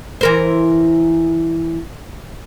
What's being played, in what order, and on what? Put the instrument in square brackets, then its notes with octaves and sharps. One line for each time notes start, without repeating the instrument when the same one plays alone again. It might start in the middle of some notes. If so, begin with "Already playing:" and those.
[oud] E3 A#4 C5